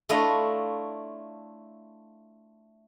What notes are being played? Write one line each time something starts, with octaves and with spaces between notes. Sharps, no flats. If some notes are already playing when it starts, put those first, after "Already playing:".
A3 D4 E4 F4 C#5 D#5